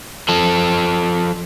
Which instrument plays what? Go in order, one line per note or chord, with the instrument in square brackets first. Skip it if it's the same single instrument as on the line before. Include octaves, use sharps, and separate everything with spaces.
[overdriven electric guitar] F3 A4